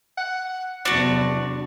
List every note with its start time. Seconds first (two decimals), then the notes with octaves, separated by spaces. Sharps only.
0.18 F#5
0.85 E2 C3 F#3 D4 F#4 D5